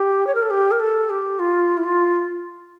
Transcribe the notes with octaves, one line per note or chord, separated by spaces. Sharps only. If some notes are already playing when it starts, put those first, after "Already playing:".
Already playing: G4
C#5
A#4
A4
G4
A#4
A4
G4
F4
E4
F4